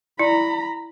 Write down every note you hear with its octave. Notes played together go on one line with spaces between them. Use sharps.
E4 D5 A#5 B5